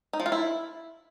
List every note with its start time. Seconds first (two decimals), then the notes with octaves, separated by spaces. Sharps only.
0.13 D#4
0.20 F3
0.26 F4
0.32 E4